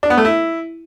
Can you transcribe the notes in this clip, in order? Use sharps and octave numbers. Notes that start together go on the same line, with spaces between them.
D4
B3
A3
E4